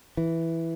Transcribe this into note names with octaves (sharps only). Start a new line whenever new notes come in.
E3